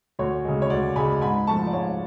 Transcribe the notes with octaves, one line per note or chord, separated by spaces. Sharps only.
D2 C#5
C#3 G#3
C#5
D2 D5
C#3 G#3 G#5 B5
G#2 G#5 B5
F3 A3 A5 C#6
D5
G#2 C#5 F5